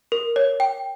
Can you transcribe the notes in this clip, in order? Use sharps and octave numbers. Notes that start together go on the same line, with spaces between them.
A#4
C#5
G5